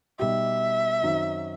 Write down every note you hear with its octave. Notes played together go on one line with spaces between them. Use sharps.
B2 G3 D#4 G4 E5
F#2 D#3 F#3 C4 D#4